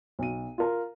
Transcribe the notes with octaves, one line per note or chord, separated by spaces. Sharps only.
B1 D#7
F4 A#4